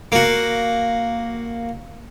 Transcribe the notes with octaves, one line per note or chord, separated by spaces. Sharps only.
A#3 F#4